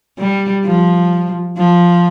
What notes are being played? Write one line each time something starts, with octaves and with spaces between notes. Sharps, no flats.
G3
F3
F3